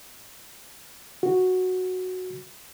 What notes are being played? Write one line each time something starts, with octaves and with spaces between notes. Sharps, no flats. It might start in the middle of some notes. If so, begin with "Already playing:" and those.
F#4